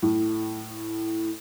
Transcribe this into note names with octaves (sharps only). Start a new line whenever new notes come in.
A2